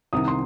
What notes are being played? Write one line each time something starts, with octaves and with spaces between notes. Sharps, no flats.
C2 C3 D#3 D#6
C6